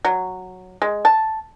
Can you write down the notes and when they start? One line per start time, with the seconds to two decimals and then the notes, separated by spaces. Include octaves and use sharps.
0.05 F#3
0.82 G#3
1.05 A5